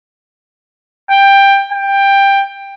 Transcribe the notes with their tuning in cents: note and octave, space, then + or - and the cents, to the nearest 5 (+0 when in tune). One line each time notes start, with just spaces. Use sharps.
G5 +15
G5 +15